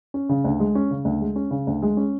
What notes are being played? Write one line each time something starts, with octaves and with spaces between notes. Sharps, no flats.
C#4
C#3
D2
G#3
C#4
C#3
D2
G#3
C#4
C#3
D2
G#3
C#4